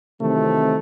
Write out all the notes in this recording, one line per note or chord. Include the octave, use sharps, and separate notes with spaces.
C3 D#3 E3 F#3 A3 C4